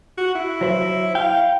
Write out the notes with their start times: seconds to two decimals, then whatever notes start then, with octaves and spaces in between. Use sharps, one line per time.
0.17 F#4
0.35 E4
0.61 F#3 C5 E5
1.15 F5 G5